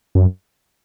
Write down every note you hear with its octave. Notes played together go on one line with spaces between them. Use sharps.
F#2